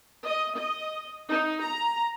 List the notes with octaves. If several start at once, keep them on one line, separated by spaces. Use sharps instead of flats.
D#5
D#5
D#4
A#5